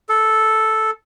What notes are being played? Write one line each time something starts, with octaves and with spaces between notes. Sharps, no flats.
A4